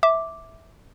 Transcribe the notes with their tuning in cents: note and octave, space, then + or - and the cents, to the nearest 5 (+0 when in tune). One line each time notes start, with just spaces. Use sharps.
E5 -10 D6 +0